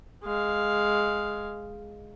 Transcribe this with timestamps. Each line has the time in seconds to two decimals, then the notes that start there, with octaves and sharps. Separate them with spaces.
0.24 G#3 F5